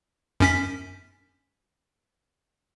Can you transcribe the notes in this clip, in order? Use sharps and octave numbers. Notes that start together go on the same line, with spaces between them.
F#2 C#4 B6